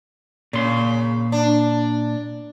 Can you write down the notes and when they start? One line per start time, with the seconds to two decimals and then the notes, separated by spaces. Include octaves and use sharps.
0.53 A#2 C#3 C6
1.32 D4